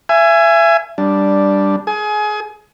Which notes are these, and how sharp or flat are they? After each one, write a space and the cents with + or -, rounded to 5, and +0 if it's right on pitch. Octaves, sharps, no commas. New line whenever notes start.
E5 +30 G#5 +0
G3 +0 D4 +0
G#4 +20 G#5 +25